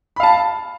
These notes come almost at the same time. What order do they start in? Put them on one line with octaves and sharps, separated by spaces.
B5 F5 A5